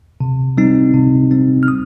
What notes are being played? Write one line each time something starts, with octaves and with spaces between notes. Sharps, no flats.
C3
G3 C4 D#4
C3
G3 C4 D#4
F6
D#6